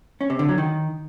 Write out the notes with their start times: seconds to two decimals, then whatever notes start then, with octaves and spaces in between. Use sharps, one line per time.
0.21 C#4
0.30 C3
0.39 D3
0.48 F#3
0.58 D#3